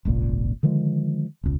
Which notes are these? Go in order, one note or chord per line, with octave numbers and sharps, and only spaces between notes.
D#1 G#1 C#2 A#2
D3 D#3 F3 G#3
E1 C#2